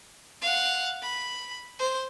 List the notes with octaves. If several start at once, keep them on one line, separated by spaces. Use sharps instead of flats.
F5 F#5
B5
C5